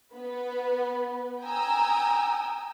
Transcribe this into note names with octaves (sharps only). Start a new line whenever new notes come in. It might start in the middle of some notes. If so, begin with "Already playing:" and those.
B3 B4
G5 G#5 A#5 D#6 E6